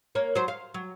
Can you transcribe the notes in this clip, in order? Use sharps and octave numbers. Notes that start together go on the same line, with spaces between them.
A#3 A#4 C#5
F#3 C5
F5
F#3